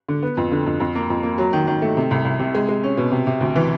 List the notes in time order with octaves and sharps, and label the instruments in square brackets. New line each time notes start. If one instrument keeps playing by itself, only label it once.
[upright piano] D3
B3
F2
D3
F2
F2
A#3
F2
A#3
F#3
D#3
D#3
A3
C3
C2
C2
C3
G#3
G#3
C#4
B2
C3
C3
D2
E3